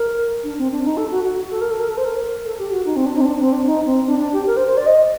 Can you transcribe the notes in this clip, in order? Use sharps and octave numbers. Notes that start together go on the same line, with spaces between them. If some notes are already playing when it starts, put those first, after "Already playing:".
Already playing: A#4
D4
C4
D4
D#4
A4
F#4
F#4
F#4
A4
A#4
A4
A#4
A4
C5
A#4
A4
G4
F#4
D#4
C4
D4
D#4
C4
D4
C4
D4
D#4
C4
D4
D4
G4
A#4
C5
C5
D5
D#5